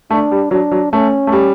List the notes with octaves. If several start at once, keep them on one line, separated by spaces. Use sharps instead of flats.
A3 D4
G3
F#3 D4
F#3
A3 C#4
A3
G3